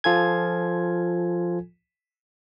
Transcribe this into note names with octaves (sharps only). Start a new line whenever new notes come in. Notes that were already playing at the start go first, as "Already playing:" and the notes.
F3 F4 A4 G#5 G#6